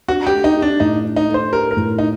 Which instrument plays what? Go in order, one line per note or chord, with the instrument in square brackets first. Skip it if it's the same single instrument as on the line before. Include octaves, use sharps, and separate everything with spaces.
[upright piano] D4 [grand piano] F#4
[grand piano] G4
[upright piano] A3
[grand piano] D#4
[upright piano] G4
[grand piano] D4
[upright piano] A2 [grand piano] D#4
[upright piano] D4
[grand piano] D#4
[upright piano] A3
[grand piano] C5
[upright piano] G4 [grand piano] A#4
[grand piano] A#4
[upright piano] A2
[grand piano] D#4